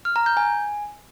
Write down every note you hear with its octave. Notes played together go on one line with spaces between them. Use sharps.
F6
A#5
G6
G#5